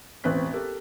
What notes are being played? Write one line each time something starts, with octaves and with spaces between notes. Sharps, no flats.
E1 A1 C4 B4 F#6 B6
G4 A4 A#4